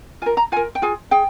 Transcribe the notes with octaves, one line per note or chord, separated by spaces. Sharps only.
F4 A#4 G#5
A#5
F4 A#4 G#5
G5
F4 G#4 G#5
G#4 G5